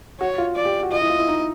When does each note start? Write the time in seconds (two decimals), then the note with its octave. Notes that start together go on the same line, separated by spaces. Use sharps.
0.20 F#4 C#5
0.38 F4
0.56 D5
0.65 G4
0.83 F#4
0.91 F4 D#5
1.01 E4
1.09 F4
1.19 E4
1.28 D#4